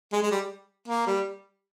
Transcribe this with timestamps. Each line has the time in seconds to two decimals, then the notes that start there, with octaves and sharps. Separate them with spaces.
0.12 G#3
0.23 G#3
0.31 G3
0.88 A#3
1.07 G3